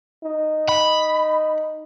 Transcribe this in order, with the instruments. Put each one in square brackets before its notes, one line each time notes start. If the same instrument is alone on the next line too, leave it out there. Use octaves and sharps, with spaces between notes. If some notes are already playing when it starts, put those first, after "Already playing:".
[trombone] D#4
[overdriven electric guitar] B5